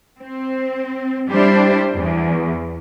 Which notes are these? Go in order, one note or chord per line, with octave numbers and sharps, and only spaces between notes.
C4
G3 D4 E4 G4 C5
E2